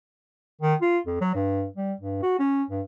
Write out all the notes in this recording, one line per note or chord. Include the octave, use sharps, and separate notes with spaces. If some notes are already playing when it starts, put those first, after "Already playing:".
D#3
F4
F2
F#3
G2
G3
G2
F#4
C#4
G2